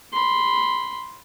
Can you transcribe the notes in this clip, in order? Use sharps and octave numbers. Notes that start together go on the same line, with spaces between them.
B5 C6